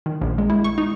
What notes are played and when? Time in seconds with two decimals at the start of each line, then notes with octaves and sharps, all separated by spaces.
0.06 D#3
0.22 A#1
0.38 G#3
0.50 E4
0.64 C#6
0.78 D#4